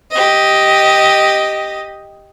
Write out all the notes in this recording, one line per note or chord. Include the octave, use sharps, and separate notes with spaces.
G4 D#5